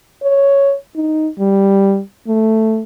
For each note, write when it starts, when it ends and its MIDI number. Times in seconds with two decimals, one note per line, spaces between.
0.23 0.74 73
0.96 1.29 63
1.39 2.00 55
2.28 2.82 57